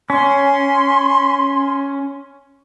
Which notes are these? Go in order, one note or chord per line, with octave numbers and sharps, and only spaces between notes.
C#4 C6